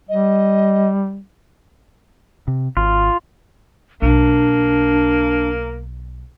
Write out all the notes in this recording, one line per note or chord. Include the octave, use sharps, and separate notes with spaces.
G3 D#5
C3
G#1 F4
B1 A#3 D4